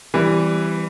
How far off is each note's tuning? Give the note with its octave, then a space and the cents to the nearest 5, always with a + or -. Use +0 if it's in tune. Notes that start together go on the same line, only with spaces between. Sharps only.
E3 +0 G3 +0 C4 -40